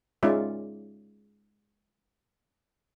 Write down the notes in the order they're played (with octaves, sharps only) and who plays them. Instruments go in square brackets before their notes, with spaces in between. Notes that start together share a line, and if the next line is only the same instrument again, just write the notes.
[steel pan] G#3 C#4 D#4 F4 D5 E5